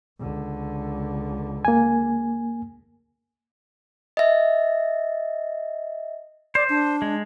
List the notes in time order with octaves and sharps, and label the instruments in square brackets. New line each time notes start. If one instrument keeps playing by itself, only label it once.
[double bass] C#2 D3
[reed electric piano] A#3 G#5
[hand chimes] D#5 E5
[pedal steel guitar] C5 [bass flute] D5
[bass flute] D4
[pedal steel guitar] G#3